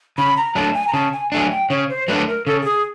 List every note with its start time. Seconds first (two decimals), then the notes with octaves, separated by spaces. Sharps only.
0.18 C#3 B5
0.37 A#5
0.55 F#3 A3 D4 A5
0.74 G#5
0.88 A#5
0.94 C#3 A5
1.13 G#5
1.32 F#3 A3 D4 G#5
1.51 G5
1.70 C#3 C#5
1.89 C5
2.08 F#3 A3 D4 B4
2.28 A#4
2.46 C#3 A4
2.62 A4
2.65 G#4